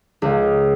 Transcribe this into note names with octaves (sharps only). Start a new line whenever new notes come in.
C#2